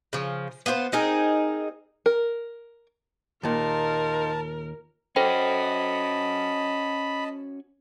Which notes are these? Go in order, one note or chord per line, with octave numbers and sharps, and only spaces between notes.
C#3 F3
B3 F4 G4 C5
C4 D#4 G#4 A#4
A#4
D#2 A#2 D#4 F4 A#4 A5
C#4 F#4 A4 C5 D#5 G5 A5 B5